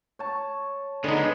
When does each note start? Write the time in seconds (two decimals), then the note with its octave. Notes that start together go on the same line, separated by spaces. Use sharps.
0.19 C#5 A5
1.04 D3 G#3 B3 D#4